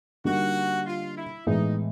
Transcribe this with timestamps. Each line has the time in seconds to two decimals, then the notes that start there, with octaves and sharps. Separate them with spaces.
0.25 D3 G3 A#3 D#4 F#4
0.86 F4
1.16 E4
1.47 A2 E3 G#3 B3 D#4